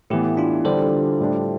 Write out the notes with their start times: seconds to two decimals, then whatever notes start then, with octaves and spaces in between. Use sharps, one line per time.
0.10 A2 E3 B3 E4 G4
0.37 D4 F4
0.65 D3 G3 D4 F4 A4 C5
1.20 A2 G3 D4